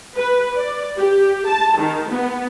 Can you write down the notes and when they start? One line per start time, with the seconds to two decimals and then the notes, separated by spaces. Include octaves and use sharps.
0.17 B4
0.56 D5
0.97 G4
1.48 A5
1.78 D#3
2.10 B3